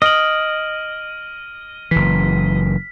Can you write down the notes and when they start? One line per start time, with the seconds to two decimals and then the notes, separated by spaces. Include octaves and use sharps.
0.02 D#5 F6 D7 F#7
1.91 F#1 E3 B6